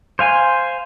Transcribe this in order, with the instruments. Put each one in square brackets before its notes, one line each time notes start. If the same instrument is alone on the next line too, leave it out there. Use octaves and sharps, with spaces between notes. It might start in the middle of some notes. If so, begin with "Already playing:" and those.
[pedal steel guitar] C5 F5 G#5